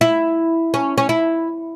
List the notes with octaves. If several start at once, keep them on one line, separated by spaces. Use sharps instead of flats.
E4
C#4
C#4
E4